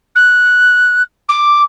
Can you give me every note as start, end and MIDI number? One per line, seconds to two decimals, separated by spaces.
0.15 1.02 90
1.29 1.62 86